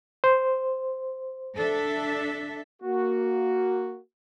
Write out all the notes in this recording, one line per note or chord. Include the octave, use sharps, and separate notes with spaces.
C5
D4 A4 E5
A#3 F#4